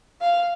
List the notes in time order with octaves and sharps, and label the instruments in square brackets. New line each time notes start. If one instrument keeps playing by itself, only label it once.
[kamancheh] F5